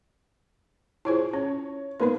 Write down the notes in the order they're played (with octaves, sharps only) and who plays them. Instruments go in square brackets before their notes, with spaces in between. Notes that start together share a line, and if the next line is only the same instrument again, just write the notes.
[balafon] E4 F4 C5 [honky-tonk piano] G#4 C#5
[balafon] C#4 [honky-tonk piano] C#5
[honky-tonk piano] A#3 B3 B4 [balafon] D#4 C6